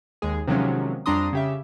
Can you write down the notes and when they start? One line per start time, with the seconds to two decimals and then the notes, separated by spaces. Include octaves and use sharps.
0.22 D#2 G#3 G#4
0.47 C3 D#3 F3 F#3 G#3 C#4
1.06 F2 G3 D4 A#5 C6 D#6
1.33 C#3 G4 E5